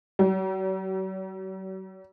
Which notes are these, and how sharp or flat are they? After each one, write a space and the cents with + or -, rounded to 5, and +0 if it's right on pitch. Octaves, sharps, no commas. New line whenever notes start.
F#3 +45